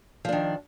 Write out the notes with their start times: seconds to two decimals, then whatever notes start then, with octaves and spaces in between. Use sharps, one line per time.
0.25 F3
0.29 D4
0.32 D#3